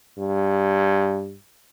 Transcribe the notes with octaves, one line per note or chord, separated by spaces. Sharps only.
G2